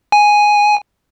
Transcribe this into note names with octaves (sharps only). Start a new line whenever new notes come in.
G#5